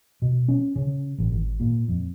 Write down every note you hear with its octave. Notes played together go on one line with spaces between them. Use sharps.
B2
C#4
C#3
A1
G#1
A#2
F2